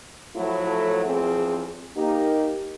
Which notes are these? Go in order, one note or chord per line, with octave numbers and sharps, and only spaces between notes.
A2 F3 F#3 A3 E4 A4
E2 F3 C4 G#4
A#3 D#4 G4